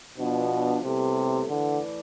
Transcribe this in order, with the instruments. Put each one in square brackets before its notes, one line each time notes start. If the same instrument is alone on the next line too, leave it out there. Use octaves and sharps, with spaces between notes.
[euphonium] B2 [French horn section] F3 B3 D4
[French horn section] A2 G3 B3 E4 A4 [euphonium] C3
[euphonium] D3 [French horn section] E3 A3 E4 B4 D5